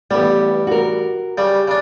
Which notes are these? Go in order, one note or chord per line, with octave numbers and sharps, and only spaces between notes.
A1 G3 B3 G4
F#4 A#4
C#3 G3
C#3 D4